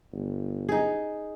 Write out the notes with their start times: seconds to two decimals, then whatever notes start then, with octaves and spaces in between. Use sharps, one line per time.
0.12 G1
0.69 D#4 G#4